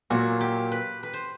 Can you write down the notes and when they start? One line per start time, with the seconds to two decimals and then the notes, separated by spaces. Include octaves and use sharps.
0.10 A#2 F#3 A#3 F#4
0.40 G4
0.72 B4
1.03 B4
1.13 C5